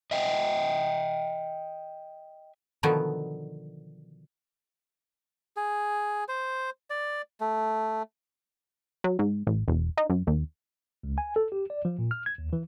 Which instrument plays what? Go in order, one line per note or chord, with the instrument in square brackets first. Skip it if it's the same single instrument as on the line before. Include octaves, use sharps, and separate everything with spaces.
[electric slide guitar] D#5 E5 G5
[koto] B2 D3 D#3 F3 F#3 B3
[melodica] G#4
C5
D5
A3
[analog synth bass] F#3
G#2
A1
E1
D#4
F#2
D#2
[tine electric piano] C#2
G#5
A4
G4
D5
F3
A#2
F6
G#6
D#2
E3